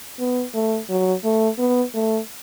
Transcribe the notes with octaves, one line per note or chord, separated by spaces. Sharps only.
B3
A3
F#3
A3
B3
A3